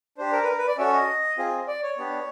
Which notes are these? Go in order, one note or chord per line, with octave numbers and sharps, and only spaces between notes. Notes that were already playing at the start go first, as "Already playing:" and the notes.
D4 G4 C5
A#4
B4
A#4
B4
D5
C#4 F#4 A4 E5
D#5
C4 F4 G#4
D5
C#5
B3 D4 G4